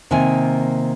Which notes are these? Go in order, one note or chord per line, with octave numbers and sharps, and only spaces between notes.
C3 D#3 A#3 D#4 G#5